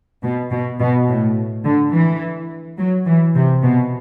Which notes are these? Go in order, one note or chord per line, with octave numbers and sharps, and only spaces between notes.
B2
B2
B2
A2
D3
E3
F#3
E3
C3
B2